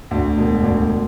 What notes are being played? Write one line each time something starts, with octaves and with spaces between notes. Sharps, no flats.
D2
E1
D2